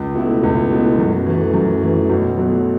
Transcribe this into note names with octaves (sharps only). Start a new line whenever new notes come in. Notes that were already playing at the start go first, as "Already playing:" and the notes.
Already playing: C#2
B2 A3 E4
C#2
B2 A3 E4
F#2
E3 A3
F#2
E3 A3
B1
B2 F#3 A3